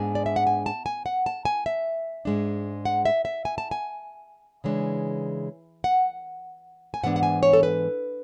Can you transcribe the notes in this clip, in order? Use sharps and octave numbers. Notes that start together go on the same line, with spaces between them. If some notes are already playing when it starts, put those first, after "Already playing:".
Already playing: G#2 G#3 B3 D4 G#5
D5
E5
F#5
G#5
A5
G#5
F#5
A5
G#5
E5
G#2 G#3 D4
F#5
E5
E5
G#5
A5
G#5
C#3 E3 G#3 D4
F#5
G#5
G#2 E3 B3 D4 F#5
F#5
G#5
C#5
A4
B4